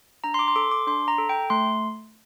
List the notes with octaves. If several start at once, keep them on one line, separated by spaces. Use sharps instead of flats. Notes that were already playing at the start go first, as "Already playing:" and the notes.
D4 A#5
C6
D6
C6
A4 D6
D6
D4 C6
A#5
A4
G5
A3 C6